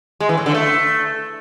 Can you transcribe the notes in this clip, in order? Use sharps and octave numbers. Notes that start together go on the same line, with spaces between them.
G#3
E3
A2
D3
A3